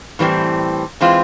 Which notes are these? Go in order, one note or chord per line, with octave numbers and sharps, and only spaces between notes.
A2 E3 G3 C4
E3 G#3 C4 F4